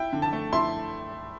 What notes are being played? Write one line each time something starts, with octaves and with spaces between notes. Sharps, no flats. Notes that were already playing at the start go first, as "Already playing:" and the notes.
Already playing: E4 G5
D3
A5
A3
E4 C6